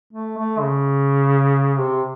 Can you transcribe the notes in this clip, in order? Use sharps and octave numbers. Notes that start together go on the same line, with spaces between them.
A3
A3
C#3
C3